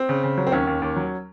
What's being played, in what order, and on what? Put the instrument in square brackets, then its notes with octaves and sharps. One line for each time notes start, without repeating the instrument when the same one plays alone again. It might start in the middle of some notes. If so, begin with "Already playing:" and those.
Already playing: [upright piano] C4
[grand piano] C#3
C#3
F#3
[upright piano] C4
[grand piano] D#2 [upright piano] C#4
[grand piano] D#2
D#2
F#3